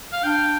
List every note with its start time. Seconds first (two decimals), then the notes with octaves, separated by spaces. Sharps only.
0.13 F5
0.24 D4 G5